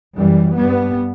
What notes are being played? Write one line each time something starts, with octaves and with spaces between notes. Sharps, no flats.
F#2 E3 G3
G2 G3 B3